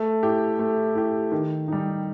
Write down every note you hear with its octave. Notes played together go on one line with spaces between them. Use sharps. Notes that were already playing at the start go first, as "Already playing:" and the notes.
Already playing: A3
E4 G4
A3
E4 G4
D#3
G3 D#4